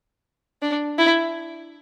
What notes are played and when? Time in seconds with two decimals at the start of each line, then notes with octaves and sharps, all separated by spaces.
0.62 D4
0.98 E4